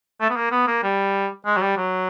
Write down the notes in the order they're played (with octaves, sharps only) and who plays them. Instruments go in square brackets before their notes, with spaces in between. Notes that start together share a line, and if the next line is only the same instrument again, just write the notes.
[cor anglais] A3
B3
A#3
B3
A#3
G3
G#3
F#3
G3
F#3